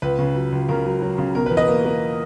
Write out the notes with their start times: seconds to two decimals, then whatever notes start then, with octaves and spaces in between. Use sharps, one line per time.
0.02 C#2 B4
0.19 C#3
0.35 F#3
0.52 C#2
0.69 C#3 A#4
0.86 F#3
1.02 F#3
1.18 C#3
1.35 B2 A#4
1.46 B4
1.51 E2
1.57 B4 D#5
1.68 A#3
1.85 A#3